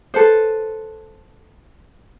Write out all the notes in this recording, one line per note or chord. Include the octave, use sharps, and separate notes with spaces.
A4 B4 C5